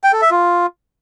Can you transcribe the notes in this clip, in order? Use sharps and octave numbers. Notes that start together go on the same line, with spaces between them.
G5
A4
E5
F4